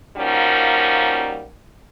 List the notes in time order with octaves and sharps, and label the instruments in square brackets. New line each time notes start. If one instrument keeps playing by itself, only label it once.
[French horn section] F3 G3 A#3 C#4 D#4 F#4